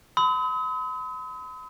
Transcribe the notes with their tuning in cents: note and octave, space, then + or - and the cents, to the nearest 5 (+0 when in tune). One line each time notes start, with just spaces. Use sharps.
B5 +45 D#6 +45